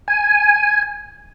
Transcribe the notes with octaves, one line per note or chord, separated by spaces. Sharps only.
G#5